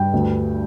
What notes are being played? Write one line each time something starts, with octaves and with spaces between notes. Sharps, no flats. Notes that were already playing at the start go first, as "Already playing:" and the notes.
Already playing: G2 G5
D2